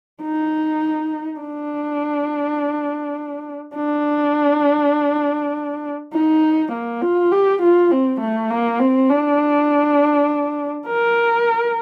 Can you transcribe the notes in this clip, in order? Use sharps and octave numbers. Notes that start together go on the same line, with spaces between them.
D#4
D4
D4
D#4
A#3
F4
G4
F4
C4
A3
A#3
C4
D4
A#4